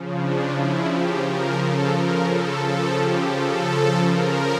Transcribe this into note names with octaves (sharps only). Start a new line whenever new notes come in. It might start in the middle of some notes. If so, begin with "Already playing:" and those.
Already playing: C#3 F3
D4
E4
G4
A#4
A4
A#4
A4
C#3 F3 A4
G4
A4
A#4